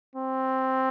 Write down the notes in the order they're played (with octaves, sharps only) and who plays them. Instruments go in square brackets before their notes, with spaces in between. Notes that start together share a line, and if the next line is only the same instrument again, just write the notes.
[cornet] C4